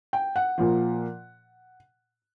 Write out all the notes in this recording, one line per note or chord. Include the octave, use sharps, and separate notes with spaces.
G5
F#5
A#2 F3